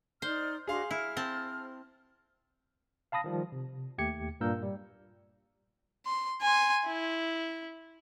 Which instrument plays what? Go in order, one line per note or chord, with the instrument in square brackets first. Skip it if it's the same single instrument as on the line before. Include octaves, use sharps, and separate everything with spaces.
[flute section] D#4 D5 F6 [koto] C5
[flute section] D4 F#4 [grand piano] G#4 F5 C6
[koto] E4 [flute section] F6
[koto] C4 A5
[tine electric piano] F5 A5 B5 D#6 A#6
D#3 F3 G3
C3
D#2 A3 G4 G#6 C#7
G2 A#2 A#3 A#4 E6 G6
G3
[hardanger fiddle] C6
G#5 C6
E4